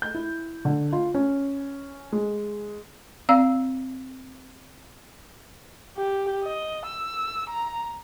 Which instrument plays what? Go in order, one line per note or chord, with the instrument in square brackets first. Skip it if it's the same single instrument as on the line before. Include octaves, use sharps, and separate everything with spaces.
[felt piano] G6
E4
D3
F4
C#4
G#3
[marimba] C4 D5 F5 E6
[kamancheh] G4
D#5
E6
A#5